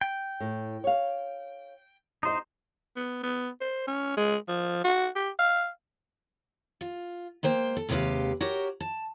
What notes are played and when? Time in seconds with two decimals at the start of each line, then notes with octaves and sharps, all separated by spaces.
0.01 G5
0.40 A2
0.84 C#5 F5
2.23 E2 D#4 C5 D#5
2.96 B3
3.23 B3
3.61 C5
3.87 C#4
4.17 G#3
4.48 F3
4.84 F#4
5.15 G4
5.39 F5
6.81 F4
7.43 G#3 A#3 C5 G5
7.77 A4
7.89 D#2 C3 G#3 G4 B4 F5
8.41 F#4 G4 A#4 C#5
8.80 A5